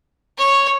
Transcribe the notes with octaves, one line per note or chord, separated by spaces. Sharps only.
C#5